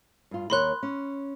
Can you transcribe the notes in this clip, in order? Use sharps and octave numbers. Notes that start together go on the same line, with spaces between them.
G2 F4
D#2 A#4 C#5 B5 C6 F#6
C#4